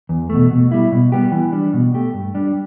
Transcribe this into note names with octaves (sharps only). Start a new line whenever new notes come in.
E2
B2 A3
B2
G3 E4
B2
G3 B3 G4
E3
G3 D4
B2
A3 G4
G2
G3 D4 G4